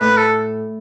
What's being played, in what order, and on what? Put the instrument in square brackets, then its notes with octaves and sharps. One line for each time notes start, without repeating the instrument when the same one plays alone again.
[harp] A2 [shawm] B4
[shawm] A4